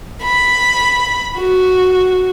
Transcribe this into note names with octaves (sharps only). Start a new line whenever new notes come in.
B5
F#4